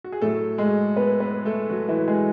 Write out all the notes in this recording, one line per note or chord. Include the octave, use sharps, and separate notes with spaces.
F#4
G#4
A2 F#3 A3 A4
G#3 G#4
B3 B4
B3 B4
A3 A4
F#3 F#4
E3 E4
G#3 G#4